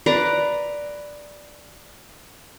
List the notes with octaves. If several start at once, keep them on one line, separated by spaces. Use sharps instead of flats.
B4 D5 A#5